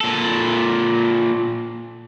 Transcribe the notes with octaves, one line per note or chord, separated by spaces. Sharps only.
A#2 A4